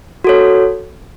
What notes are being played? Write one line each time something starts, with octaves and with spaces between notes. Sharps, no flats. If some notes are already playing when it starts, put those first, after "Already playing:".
F#4 A4 C#5